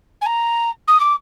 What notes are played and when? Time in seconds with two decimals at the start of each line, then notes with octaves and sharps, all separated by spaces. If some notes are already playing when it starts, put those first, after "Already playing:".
0.21 G#5
0.26 A#5
0.87 D#6
1.00 D6